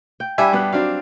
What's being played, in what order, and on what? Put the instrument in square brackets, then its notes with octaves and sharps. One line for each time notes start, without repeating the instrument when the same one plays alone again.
[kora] G5
[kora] G3 D4 E4 [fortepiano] E5 G#5 E6
[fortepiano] G2 B3 F#6
[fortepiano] F#3 C4 D4 [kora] F5